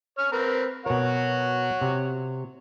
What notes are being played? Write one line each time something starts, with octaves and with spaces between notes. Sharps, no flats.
C#5 F6
C4 A#4 B4
B2 F#4 A#4 C#5 F#5
C3